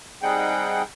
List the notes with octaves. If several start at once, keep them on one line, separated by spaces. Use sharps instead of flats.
G3 C4 D#4 G#4 F#5 G5